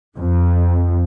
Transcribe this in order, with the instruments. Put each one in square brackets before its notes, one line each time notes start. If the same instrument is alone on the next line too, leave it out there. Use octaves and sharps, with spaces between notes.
[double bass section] F2